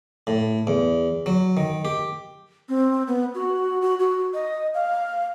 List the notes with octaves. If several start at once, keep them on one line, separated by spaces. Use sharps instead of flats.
A2
E2
F#3
D#3
G4
C4
B3
F#4
F#4
F#4
D#5
F5